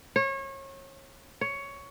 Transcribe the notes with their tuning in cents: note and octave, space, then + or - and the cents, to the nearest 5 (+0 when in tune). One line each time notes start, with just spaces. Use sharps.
C#5 -30
C#5 +10